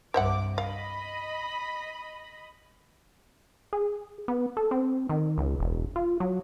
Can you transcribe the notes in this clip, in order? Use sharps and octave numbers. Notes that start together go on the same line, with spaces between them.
C2 G2 C5 E5 F#5 D6
D#5 F5 B5
G#4
B3
A4
C4
D#3
C#2
E1
F4
F#3